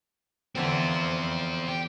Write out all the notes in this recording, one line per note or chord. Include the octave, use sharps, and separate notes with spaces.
E2 D3 E3 C4 F4
G4